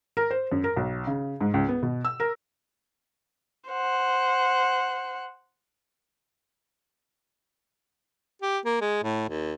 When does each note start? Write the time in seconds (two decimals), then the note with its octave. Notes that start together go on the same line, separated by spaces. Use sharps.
0.17 A#4
0.31 C5
0.52 F#2
0.64 A#4
0.76 B1
1.07 C#3
1.41 G#2
1.54 C#2
1.69 B3
1.83 B2
2.05 E6
2.20 A#4
3.70 C5 F#5
8.42 G4
8.65 A#3
8.81 G#3
9.03 A2
9.29 D#2